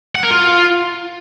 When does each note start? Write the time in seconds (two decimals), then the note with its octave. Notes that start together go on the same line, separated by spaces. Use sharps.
0.15 F#5
0.23 A#4
0.30 F4